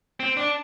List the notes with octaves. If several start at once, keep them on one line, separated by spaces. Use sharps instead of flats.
C4
D4